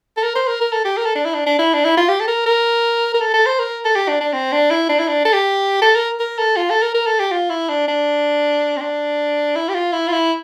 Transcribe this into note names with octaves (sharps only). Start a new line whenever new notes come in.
A4
A#4
C5
A#4
A#4
A4
G4
A#4
A4
D4
E4
D4
D4
E4
D4
E4
F4
G4
A4
A#4
A#4
A#4
A4
A4
C5
A#4
A4
G4
D4
D4
C4
D4
E4
D4
E4
D4
A4
G4
A4
A#4
A#4
A4
F4
A4
A#4
A#4
A4
G4
F4
E4
D4
D4
C4
D4
E4
G4
F4
E4
F4
E4